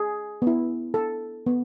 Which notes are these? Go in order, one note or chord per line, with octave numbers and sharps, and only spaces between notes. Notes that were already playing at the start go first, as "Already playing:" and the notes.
Already playing: G#4
B3
E4
A4
B3